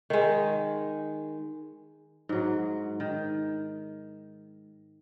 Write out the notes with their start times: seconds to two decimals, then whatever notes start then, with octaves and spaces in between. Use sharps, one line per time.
0.10 D#3 G#3
2.29 G#2 F#3
3.00 D#3